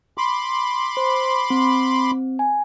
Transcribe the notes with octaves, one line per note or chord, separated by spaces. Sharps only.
B5 C6 D6
C5
C4
G#5